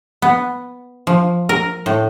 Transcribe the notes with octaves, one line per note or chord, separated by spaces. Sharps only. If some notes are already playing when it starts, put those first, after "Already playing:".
B3
F3
A#4
A2